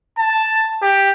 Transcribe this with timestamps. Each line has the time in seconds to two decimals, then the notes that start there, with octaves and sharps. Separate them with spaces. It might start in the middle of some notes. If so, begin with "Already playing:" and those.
0.18 A5
0.82 G4